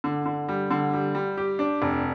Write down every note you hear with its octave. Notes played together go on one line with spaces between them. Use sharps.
D3
D3
G3
D3
G3
G3
G4
D4
F1